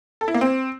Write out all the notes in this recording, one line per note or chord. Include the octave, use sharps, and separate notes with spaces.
A4
E4
A#3
C4